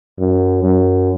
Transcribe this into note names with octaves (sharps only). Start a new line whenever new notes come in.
F#2
F#2